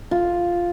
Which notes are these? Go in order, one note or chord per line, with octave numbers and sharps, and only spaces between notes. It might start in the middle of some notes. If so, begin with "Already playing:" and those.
F4